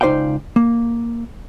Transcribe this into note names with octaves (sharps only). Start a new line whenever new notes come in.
C#2 D#4 C5 D5 F5 G5
A#3